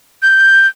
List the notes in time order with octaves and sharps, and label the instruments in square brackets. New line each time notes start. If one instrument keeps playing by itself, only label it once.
[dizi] G6